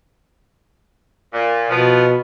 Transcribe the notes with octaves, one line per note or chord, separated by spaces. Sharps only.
A#2
B2 F3 B3